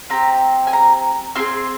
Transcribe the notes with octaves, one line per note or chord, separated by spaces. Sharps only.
C4 G4 A#5
G#5
A#5
C4 F4 G#4 C6